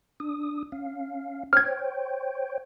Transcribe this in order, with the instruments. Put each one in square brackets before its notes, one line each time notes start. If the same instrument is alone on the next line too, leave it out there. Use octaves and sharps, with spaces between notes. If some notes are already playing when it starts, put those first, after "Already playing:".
[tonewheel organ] D4 D#6
C#4 F5
[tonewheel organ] C5 C#5 G5 [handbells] F6 G#6